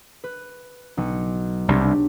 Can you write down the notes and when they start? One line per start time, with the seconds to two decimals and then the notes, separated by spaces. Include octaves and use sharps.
0.24 B4
0.97 B1 C#7
1.68 C2 F#3 D4 G4